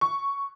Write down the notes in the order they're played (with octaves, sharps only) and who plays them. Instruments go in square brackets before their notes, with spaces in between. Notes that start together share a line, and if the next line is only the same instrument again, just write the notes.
[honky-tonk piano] C#6